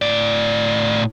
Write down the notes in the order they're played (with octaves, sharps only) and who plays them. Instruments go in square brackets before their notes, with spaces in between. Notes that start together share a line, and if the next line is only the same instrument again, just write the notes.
[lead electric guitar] A2 D5